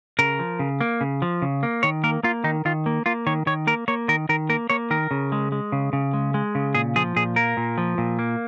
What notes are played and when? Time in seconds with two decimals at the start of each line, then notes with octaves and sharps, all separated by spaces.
0.19 C#3 A#4
0.39 F3
0.59 C#3
0.81 A#3
1.01 C#3
1.22 F3
1.42 C#3
1.63 A#3
1.83 D#3 C#5
2.04 A#3 A#4
2.23 A#3 F4
2.44 D#3 D#4
2.65 D#3 F4
2.86 A#3
3.06 A#3 F4
3.26 D#3 C#5
3.47 D#3 C#5
3.67 A#3 A#4
3.88 A#3 C#5
4.08 D#3 A#4
4.29 D#3 A#4
4.49 A#3 A#4
4.70 A#3 C#5
4.91 D#3 A#4
5.11 C#3
5.32 G#3
5.52 G#3
5.72 C#3
5.93 C#3
6.14 G#3
6.34 G#3
6.55 C#3
6.75 A#2 G#4
6.96 F3 G#4
7.16 A#2 G#4
7.36 A#3 A#4
7.57 A#2
7.78 F3
7.98 A#2
8.19 A#3